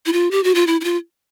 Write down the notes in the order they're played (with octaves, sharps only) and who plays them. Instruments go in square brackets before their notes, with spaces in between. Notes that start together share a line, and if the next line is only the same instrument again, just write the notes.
[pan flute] E4
F4
G4
F#4
F4
E4
E4
F4